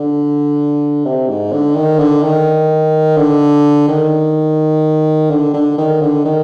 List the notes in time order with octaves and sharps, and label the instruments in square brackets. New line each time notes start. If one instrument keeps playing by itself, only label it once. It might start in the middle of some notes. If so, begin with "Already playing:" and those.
Already playing: [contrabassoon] D3
C3
G#2
D3
D#3
D3
D#3
D3
D#3
D3
D3
D#3
D3
D#3